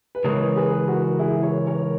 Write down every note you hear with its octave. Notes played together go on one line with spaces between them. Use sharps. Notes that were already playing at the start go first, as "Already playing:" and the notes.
B4
C#3 E3 G#3 A#4 C#5
G#4 B4
F#4 A#4
E4 G#4
A#4 C#5
A#4 C#5